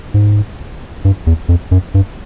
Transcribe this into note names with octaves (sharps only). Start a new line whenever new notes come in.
G#2
G2
E2
F2
F#2
G2